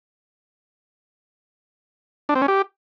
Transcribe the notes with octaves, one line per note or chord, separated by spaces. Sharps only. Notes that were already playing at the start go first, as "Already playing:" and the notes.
D4
C4
C#4
G4